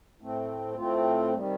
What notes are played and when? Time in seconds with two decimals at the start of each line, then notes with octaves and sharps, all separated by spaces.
0.21 A2 A3 C4
0.77 A2 A3 C4 F4
1.34 C3 D#3 G3